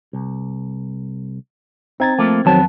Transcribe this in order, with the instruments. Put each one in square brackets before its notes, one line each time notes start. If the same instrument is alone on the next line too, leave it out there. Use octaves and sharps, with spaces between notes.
[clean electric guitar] C2
[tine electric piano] C4 G#6 A6 [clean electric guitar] D#4
[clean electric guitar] F3 A3 A#3
[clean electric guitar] F2 B3 A5 [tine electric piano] D#3 F#3 C4